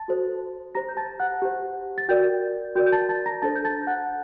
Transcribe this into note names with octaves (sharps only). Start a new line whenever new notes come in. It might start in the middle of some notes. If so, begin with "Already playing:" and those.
Already playing: A5 A6
F#4 A4 C5
G4 C5 A#5 A#6
G6
A5 A6
F#5 F#6
G4 C5
A6
F#4 A#4 D5 G5 G6
F#4 A#4 D5 G5 G6
G6
A5 A6
A5 A6
A#5 A#6
D4 A4 C5 A5 A6
G6
A5 A6
G6
F#5 F#6